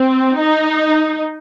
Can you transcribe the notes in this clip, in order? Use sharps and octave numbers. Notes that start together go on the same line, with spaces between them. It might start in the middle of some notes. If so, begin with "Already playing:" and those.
Already playing: C4
D#4